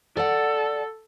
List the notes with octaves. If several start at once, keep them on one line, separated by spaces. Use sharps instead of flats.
A4 D5 F#5